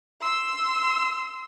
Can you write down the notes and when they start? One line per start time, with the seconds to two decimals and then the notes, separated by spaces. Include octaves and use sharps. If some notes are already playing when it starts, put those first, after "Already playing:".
0.21 C6 E6